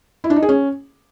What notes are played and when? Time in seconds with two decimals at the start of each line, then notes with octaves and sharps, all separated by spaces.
0.24 E4
0.30 D4
0.36 D#4
0.42 G#4
0.49 C#4